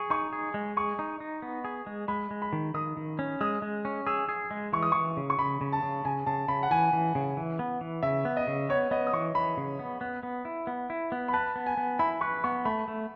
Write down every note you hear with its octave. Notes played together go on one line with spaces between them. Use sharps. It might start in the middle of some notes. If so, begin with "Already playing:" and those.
Already playing: G#4 C#6
D#4 C#6
G#4
G#3
G#4 C#6
D#4
D#4
B3
G#4
G#3
G#3 B5
G#3
B5
D#3
D#3 D#6
D#3
C#4
G#3 D#6
G#3
C#4
G#4 E6
G#4
G#3
E3 C#6
D#6
E3 C#6
C#3
C#6
C#3 B5
C#3
A5
C#3
C#3 G#5
C#3 A5
C#3 B5
F#5
E3 G#5
E3
C#3
E3
B3
E3
C#3 E5
B3
D#5
C#3
B3 C#5
B3 D#5
D#6
E3 C#6
E3 B5
C#3
B3
B3
B3
E4
B3
E4
B3
B5
B4 A5
B3
G#5
B3
E4 B5
B4 C#6
B3 C#6
A3 B5
A3